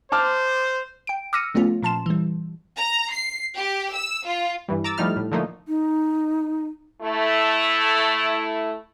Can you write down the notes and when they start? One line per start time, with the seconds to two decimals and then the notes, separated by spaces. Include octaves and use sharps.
0.12 C5 A5 D6 F6
1.07 G5 D7
1.33 D6 E6 F6 A#6 C#7 D#7
1.54 F3 A3 B3 C#4 F4
1.82 A#2 F3 A5 C6 E7
2.06 E3 G3
2.76 A#5
3.13 C7
3.57 G4
3.94 E6
4.25 F4
4.68 G2 E3 G3
4.84 A#5 D6 E6 A6
4.98 F3 G3 A3 D#4 E4 F6
5.16 A2
5.31 D3 F3 A3 A#3 D#4
5.68 D#4
7.02 A3 E4